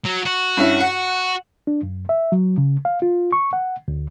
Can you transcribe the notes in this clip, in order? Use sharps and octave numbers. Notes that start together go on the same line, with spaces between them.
F#3
F#4
G2 C#4 E4
F#5
D4
F#2
E5
F#3
C#3
F5
F4
C#6
F#5
D2